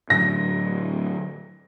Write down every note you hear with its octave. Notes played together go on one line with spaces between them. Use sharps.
A2 D3 F#3 A#6